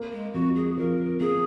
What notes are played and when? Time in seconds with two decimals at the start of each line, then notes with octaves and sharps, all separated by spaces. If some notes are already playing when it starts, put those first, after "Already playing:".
Already playing: A#3
0.12 G#3
0.33 F2 F#4
0.55 G#4
0.78 F3 A#4
1.20 A#3 G#4